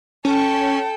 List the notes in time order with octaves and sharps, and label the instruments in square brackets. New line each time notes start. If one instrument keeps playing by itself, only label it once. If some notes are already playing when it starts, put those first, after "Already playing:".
[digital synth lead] C#4 [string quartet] A4 G5